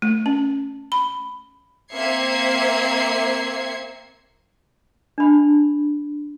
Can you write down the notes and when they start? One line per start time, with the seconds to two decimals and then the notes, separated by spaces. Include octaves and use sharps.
0.02 A3
0.26 C#4
0.92 B5
1.93 A#3 C4 E5 G#6 C7 C#7
5.18 D4 B5